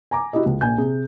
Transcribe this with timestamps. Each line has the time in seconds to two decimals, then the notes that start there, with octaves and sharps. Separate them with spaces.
0.11 G#5 A#5 D6
0.33 E4 F#4 G4 D#5
0.46 C#2
0.61 A#1 G#5 G6
0.78 C3 G#4